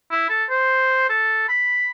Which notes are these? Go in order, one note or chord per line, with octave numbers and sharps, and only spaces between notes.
E4
A4
C5
A4
B5